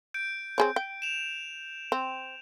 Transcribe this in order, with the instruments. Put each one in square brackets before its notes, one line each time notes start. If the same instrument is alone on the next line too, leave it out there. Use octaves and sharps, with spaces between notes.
[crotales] G6 D7
[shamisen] C4 G#4 C#5
G5
[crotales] E7 F7
[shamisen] C4